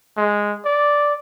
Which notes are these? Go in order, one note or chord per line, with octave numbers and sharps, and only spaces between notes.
G#3
D5